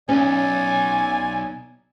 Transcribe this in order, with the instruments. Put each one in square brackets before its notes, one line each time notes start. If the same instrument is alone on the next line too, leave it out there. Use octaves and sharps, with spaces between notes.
[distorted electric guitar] B1 [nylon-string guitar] C#4 [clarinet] D5 [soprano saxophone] G#5